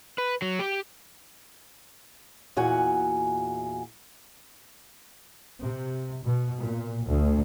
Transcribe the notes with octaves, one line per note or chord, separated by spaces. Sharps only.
B4
F#3
G4
E2 A#2 F#4 F#5 G#5
C3
B2
A#2
D2